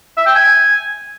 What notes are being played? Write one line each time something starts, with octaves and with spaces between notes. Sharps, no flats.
E5
G5
G#5